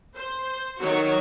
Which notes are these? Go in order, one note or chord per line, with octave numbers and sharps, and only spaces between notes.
C5
D#3 F#3 F#4 C#5